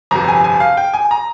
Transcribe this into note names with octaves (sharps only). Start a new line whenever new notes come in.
G1 F2 C3 A#5
G#5
G#5
F5
G5
G#5
A#5